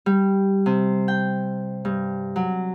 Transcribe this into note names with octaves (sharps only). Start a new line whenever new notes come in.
G3
C3
G5
G2
F#3